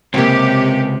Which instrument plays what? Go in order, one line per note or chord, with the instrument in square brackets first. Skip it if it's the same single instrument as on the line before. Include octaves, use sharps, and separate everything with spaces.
[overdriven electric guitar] C#2 [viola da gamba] C3 [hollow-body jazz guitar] A#3 C4 [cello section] G4